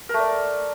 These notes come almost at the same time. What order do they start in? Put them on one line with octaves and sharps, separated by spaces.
A#4 A3 D5